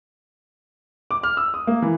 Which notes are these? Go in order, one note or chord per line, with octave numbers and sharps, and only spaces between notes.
D6
F6
E6
D#6
A#3
E3